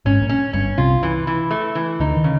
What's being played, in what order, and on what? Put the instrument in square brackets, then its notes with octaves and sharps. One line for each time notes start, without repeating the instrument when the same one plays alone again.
[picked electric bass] G#1 G#2 [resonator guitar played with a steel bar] C#4
[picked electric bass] A#1 A#2
[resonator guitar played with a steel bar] C#4
[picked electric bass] G1 G2 [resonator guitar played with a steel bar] C#4
[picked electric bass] C2 C3 [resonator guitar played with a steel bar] F4
[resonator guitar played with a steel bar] E3
E3
A3
E3
[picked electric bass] D2 D3 [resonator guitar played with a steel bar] D#4
[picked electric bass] D#3
[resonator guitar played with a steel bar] C#3